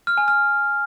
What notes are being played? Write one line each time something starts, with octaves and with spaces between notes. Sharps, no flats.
F6
G#5
F6